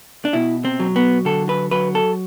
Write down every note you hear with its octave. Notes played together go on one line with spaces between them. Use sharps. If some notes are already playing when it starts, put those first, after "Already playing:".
D4
B2 E4
C4
F#3
B3
D3 A4
B4
F#3 B4
A4